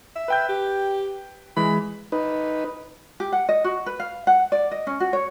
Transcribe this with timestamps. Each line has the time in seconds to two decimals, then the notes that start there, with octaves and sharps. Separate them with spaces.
0.16 E5
0.28 B4 G5 G6
0.49 G4
1.57 E3 G#3 B5
2.12 D#4 B4
3.20 G4
3.32 F#5
3.49 D#5
3.64 F#4
3.86 B4
4.00 F5
4.27 F#5
4.52 D5
4.71 D#5
4.87 C#4
5.00 F#4
5.13 C#5